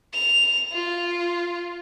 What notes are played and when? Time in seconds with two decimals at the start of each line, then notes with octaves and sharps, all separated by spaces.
0.13 F7
0.73 F4